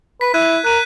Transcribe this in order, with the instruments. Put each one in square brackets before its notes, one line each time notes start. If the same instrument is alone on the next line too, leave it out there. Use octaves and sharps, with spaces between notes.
[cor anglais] B4 [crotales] B6
[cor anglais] E4 [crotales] F#6 G#6 D#7
[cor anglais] A#4 [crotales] F#6 D#7